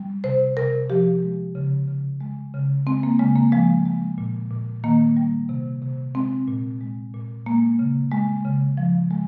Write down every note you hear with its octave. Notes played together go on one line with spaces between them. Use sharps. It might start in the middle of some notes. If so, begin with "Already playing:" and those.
Already playing: G3
C3 C5
C3 A#4
F3 G4
G#3
C#3
C#3
G#3
C#3
G#3 C4
A#3
C#3 G#3
A#3
F3 G#3
G#3
A#2
A#2
D#3 A#3
G3
C3
C3
G#3 C4
A#2
G#3
A#2
G#3 A#3
C#3
G#3
C#3
F3
G#3